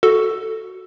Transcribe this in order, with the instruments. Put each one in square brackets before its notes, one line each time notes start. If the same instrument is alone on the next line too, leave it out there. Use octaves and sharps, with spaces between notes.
[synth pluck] F#4 A4